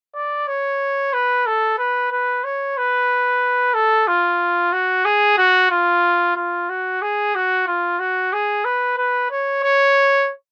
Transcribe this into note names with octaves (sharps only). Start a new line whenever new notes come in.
D5
C#5
B4
A4
B4
B4
C#5
B4
A4
F4
F#4
G#4
F#4
F4
F4
F#4
G#4
F#4
F4
F#4
G#4
B4
B4
C#5
C#5